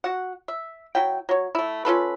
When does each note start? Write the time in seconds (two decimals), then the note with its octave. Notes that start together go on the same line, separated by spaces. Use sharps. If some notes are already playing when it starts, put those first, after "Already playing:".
0.04 F#4 F#5
0.48 E5
0.95 F#3 E4 G5
1.29 F#3 C#5
1.55 A3 E4
1.85 C#4 F4 A4 B4